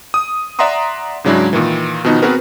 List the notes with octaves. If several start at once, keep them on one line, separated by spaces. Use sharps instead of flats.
D#6
D5 E5 F#5 A#5 C6 D#6
G#2 C#3 F#3 G#3 D4 E4
A#2 D#3 E3
B2 D#3 F3 B3 D#4
B3 C4 F#4 G#4 A#4 B4